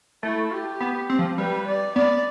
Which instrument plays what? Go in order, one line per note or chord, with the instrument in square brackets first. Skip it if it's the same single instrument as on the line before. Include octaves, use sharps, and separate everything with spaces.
[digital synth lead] A3 [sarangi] E4
[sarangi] G4
[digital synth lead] B3
C4
F3
[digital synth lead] G3 [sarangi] B4
[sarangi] D5
[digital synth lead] B3 [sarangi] D5